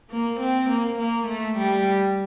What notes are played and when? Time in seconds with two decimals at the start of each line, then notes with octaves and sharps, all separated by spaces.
0.11 A#3
0.41 C4
0.70 A#3
0.99 A#3
1.28 A3
1.58 G3